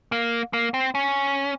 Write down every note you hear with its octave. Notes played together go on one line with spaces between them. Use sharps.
A#3
A#3
C4
C#4